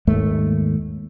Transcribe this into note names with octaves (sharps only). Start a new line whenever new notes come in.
D#2 G#2 A3